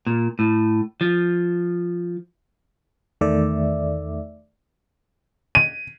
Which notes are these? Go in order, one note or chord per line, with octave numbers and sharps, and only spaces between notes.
A#2
A2
F3
E2 D#3 A3 D5 E5
D#7